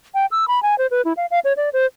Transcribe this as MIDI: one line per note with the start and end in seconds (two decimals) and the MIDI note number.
0.14 0.26 79
0.31 0.45 88
0.48 0.62 83
0.63 0.77 80
0.78 0.87 72
0.91 1.02 71
1.05 1.13 64
1.17 1.26 77
1.31 1.39 77
1.45 1.53 73
1.57 1.69 74
1.73 1.86 72